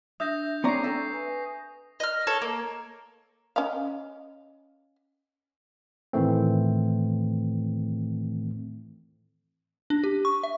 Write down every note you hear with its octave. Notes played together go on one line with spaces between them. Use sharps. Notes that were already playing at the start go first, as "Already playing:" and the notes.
D4 E5 D#6 G6 A#6
C4 G#4 B4 C#5 D5 A#5 C#6 C7
A4 E5 G5
B4 G#5
D#5 F6
A4 C#5
A#3
C#4 D#5 F5
A2 D#3 E3 A3 C4
D4
G4
C#6
E5